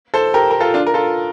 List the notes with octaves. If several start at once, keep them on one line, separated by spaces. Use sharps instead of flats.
A4 C5
G4 A#4
A#4
F4 A4
D4 F4
A#4
F4 A4